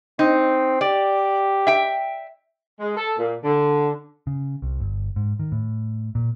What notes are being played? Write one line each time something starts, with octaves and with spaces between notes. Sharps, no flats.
C4 D#4
G4 D5
E5 G5
G#3
A4
A#2
D3
C#3
C2
G1
G#2
D#3
A2
A#2